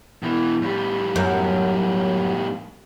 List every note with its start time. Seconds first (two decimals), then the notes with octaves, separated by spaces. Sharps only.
0.23 B2 E3
0.62 A2 G3
1.16 F#2